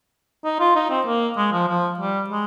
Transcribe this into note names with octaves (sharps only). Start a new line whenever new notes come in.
D#4
F4
D#4
C4
A#3
G#3
F3
F3
G3
G#3